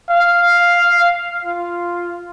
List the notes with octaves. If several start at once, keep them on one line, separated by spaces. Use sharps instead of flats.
F5
F4